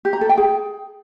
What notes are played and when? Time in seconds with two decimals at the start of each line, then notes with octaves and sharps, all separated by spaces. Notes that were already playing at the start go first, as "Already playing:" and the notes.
0.05 G4
0.13 A#5
0.21 A4
0.29 G5
0.38 G#4